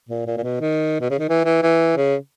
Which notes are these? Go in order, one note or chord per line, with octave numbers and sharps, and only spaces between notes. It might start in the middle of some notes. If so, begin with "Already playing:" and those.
A#2
A#2
A#2
B2
D#3
B2
C#3
D#3
E3
E3
E3
C#3